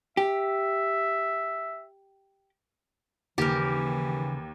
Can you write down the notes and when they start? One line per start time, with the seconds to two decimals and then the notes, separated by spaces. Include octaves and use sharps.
0.17 G4 E5
3.38 D#2 C#3 E3 G4 A#4